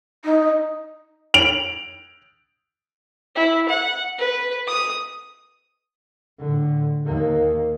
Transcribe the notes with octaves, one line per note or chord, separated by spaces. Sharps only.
D#4
D7 F7 F#7
E4
F#5
B4
D#6
A2 D3
D#2 A#3